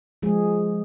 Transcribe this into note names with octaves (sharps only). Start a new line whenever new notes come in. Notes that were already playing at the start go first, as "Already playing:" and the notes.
F3 G#3 G#4